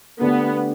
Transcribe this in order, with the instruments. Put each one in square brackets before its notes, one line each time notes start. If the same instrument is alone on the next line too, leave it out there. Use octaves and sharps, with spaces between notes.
[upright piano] D3 A3 D4 G4 [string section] B3